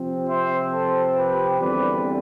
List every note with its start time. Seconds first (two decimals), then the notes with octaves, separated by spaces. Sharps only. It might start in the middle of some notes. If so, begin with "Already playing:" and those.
Already playing: C3 F3 C4
0.30 C5 E5
0.73 A4 C5
1.17 G4 B4
1.61 E2 D3 G3 C4 B4 D5